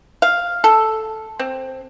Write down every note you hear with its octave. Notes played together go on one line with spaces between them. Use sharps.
F5
A4
C4